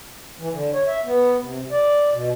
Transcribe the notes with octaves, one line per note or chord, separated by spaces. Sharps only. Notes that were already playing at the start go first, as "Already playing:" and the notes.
E3
D3
C#5
E5
B3
C3
D5
B2